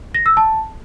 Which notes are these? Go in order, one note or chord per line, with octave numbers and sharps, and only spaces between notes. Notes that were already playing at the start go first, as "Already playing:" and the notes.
A#6
E6
A5